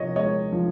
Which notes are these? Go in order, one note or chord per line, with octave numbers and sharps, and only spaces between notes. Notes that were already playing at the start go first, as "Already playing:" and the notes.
Already playing: C3 F3 C#5 D#5
G#3 C#5 D#5
F3